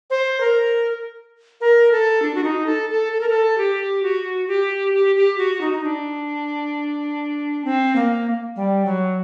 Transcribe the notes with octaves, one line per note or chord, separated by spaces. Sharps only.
C5
A#4
A#4
A4
D4
F#4
D#4
A4
A4
A4
A#4
A4
G4
F#4
G4
G4
G4
F#4
D#4
D#4
D4
C4
A#3
G3
F#3